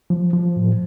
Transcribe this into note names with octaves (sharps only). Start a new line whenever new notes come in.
F3
F3
A2